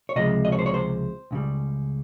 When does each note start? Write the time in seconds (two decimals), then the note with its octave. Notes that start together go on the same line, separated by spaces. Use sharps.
0.09 C#5
0.16 C#2 C3 F3 G#3 D#5
0.45 D#5
0.52 C#5
0.59 C5
0.66 C#5
0.74 C5
1.31 C#2 C#3 G3